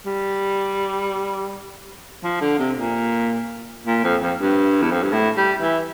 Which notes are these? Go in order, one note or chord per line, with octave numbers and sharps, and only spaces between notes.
G3
F3
D3
C3
A#2
A#2
F2
F2
G2
E2
F2
G2
A2
G3
E3